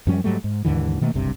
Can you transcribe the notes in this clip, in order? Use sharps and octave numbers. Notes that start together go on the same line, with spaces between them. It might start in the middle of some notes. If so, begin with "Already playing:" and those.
F#2 F3 G3 C#4
G#2 F#3 G3 A3
G#2
D#2 G#2 D3 E3
B2 D#3 A3 A#3
F#1 C2 G2 C3